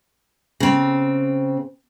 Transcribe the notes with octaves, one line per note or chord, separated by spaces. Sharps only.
C#3 C4